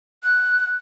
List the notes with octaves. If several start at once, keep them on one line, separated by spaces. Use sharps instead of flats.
F#6